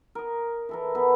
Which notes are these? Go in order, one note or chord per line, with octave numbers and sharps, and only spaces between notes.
A#4 D#5
E3 A4 A#4
B3 E4 A4 B4